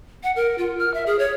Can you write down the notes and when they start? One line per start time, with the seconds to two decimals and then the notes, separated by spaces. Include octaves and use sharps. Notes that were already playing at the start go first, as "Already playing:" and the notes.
0.23 F#5
0.36 A#4
0.58 F4
0.78 F6
0.94 E5
1.06 G#4
1.19 C#5